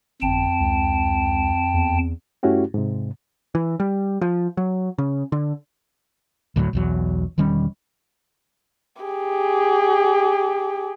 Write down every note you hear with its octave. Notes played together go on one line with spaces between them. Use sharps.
G1 F2 G5 A5
C#2
E2
G2 A3 C#4 E4 F#4 G4
G#2 C3
E3
G3
F3
F#3
C#3
D3
D2 A2 F3 F#3
B1 E2 F#3
E1 D#3 G3 C#4
G4 G#4